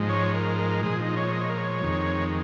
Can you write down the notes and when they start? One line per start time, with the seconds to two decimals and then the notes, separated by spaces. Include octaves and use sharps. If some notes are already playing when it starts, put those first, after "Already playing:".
Already playing: G#2 F3 G#3
0.09 C#5
0.35 A#4
0.59 A#4
0.83 A#2 F3 G#3 G#4
1.00 D#4
1.17 C#5
1.33 D#5
1.41 C#5
1.49 A#4
1.57 C#5
1.83 F2 D#3 G#3